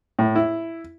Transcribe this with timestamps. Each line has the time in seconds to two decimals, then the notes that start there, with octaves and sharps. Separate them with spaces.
0.19 A2
0.35 E4